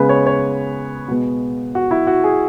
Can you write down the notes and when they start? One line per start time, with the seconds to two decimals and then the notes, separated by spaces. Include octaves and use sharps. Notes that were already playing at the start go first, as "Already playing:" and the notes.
Already playing: C#3 G#3 B3 B4
0.09 C#5
0.26 C#5
1.08 B2 G#3 B3 F#4
1.75 F#4
1.91 E4
2.07 F#4
2.24 G#4